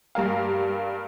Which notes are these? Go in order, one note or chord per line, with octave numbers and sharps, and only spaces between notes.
G2 G3 A#4 F5